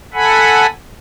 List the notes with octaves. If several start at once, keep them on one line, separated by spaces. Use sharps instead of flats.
A4 F#5 G#5 B5